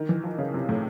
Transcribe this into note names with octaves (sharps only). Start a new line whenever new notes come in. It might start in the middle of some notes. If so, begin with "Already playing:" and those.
Already playing: D#3
E3
F3
C#3
C3
A2